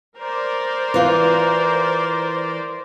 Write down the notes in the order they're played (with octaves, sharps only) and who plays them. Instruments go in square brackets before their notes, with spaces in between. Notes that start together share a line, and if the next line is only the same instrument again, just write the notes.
[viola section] A#4 C5 D5
[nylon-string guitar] E3 F4